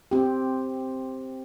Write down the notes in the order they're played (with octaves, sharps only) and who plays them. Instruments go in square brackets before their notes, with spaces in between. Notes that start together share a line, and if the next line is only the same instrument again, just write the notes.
[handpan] C4 G4